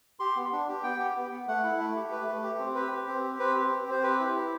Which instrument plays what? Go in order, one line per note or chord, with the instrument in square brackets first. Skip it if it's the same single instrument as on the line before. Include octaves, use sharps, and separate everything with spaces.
[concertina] G4 C6
B3
D4
G4
B3 G5
G4
B3
B3
A3 F#5
E4
A3
G4
A3 B4
A3
G4
C4
G4 B4
G4
C4
G4
C4 B4
G4
C4
C4 C5
G4 B4
E4
G4